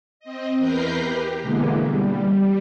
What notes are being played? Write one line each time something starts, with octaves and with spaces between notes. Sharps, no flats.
C4 D#5
E2 A#4 B4 G6 A#6 C7
G4
B2 D3 E3 G#3 A#3 B3
G3